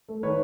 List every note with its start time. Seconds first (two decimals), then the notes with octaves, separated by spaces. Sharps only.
0.09 A3
0.23 D#3 B4 C#5